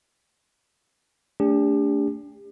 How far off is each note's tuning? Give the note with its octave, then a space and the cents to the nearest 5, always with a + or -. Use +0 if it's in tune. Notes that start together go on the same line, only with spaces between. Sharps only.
A3 +5 D4 -30 G4 +35